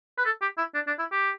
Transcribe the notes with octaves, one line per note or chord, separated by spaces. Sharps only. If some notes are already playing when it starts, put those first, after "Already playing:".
B4
A4
G4
E4
D4
D4
E4
G4